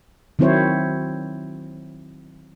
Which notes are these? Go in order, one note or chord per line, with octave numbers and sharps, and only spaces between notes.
D#3 F#3 C4 E4 C5 C#5